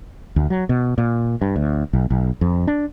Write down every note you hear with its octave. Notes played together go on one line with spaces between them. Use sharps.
D2
F#3
B2
A#2
G2
D2
B1
B1
F2
D4